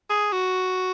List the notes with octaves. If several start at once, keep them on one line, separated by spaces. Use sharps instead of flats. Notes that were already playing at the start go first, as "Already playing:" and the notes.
G#4
F#4